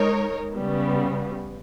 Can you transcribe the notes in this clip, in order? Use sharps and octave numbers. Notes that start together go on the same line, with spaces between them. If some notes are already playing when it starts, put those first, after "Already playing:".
Already playing: G#3 D#4 A#4 C#5
C#3 G3 B3